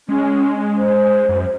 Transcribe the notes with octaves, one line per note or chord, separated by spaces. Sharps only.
G#3 C#4
C5
F#2